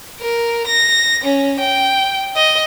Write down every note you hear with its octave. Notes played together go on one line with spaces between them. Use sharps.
A#4
A#6
C#4
G5
D#5